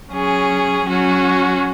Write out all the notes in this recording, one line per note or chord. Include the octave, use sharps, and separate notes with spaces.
F#3 C#4 G#4
F#3 C#4 F#4